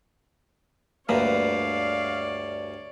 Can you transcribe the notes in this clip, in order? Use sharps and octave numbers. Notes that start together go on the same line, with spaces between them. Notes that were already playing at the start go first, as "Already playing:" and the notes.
D2 G2 D3 A#3 B4 C#5 D5 F5